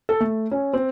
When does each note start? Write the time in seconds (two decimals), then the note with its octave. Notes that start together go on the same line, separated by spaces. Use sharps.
0.09 A4
0.20 A3
0.51 C#4
0.73 C4